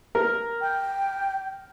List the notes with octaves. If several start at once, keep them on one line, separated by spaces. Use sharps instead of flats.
A#4
G5